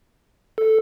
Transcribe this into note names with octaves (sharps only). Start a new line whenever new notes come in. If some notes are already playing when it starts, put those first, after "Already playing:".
A4